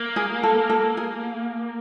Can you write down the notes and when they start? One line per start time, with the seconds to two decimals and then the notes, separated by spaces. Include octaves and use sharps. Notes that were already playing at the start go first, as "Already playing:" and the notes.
Already playing: A#3
0.16 G#4
0.43 A4
0.70 A4
0.97 G#4